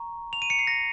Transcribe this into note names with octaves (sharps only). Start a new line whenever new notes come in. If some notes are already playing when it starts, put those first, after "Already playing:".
Already playing: A#5 C#6
F7
D#7
C#7
C7
A#6